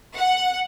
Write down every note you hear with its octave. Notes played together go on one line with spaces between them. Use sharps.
F#5